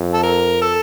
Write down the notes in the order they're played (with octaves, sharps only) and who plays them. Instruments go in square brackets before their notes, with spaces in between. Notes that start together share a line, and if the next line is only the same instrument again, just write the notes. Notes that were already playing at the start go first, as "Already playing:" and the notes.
Already playing: [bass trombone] F2
[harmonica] A4
A#4
A4